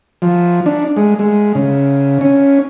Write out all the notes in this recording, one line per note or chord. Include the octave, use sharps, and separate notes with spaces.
F3
D4
G#3
G#3
C#3
C#4